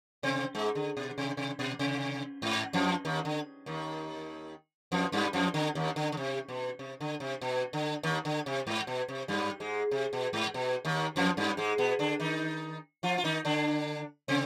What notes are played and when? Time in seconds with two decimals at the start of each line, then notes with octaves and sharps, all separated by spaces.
0.23 C3 C4
0.55 G#2 G#3
0.75 D3
0.97 B2
1.18 C3
1.37 C3
1.59 B2
1.79 C3
2.42 G#2
2.73 F2 F3
3.05 D#2 D#3
3.25 D3
3.66 D#2 D#3
4.92 F2 F3
5.12 G2 G3
5.33 F2 F3
5.54 D3
5.75 D#2 D#3
5.96 D3
6.12 D3
6.17 C3
6.48 B2
6.79 C3
7.00 D3
7.20 C3
7.41 B2
7.73 D3
8.03 D#2 D#3
8.25 D3
8.46 C3
8.67 G#2
8.87 B2
9.08 C3
9.28 G2 G3
9.60 G#2 G#3
9.91 C3
10.13 B2
10.33 G#2
10.54 B2
10.85 D#2 D#3
11.16 F2 F3
11.37 G2 G3
11.57 G#2 G#3
11.78 B2 B3
11.99 D3 D4
12.20 D#3 D#4
13.03 F3 F4
13.18 F4
13.24 D#3 D#4
13.45 D3 D4
14.28 C3 C4